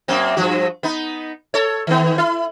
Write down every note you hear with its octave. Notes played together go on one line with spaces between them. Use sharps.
F#2 A#3 C4
G2 F3 F#4
B3 D#4
A4 C#5
D#3 B3
E4